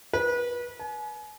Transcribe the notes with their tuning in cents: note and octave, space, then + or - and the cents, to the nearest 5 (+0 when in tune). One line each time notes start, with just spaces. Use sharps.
B4 -30
G#5 +35